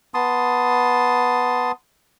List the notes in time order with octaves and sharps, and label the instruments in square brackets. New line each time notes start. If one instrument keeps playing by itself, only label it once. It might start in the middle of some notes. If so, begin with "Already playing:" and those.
[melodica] B3 A5 C6 D#6